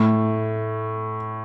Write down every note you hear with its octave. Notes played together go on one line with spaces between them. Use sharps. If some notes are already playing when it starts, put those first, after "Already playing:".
Already playing: A2